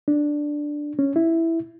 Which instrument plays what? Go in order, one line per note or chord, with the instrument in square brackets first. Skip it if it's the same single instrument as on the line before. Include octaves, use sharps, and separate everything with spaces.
[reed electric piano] D4
C#4
E4